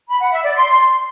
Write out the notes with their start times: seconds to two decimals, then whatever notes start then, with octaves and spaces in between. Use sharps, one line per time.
0.08 B5
0.20 F#5
0.32 E5
0.43 D5
0.55 C6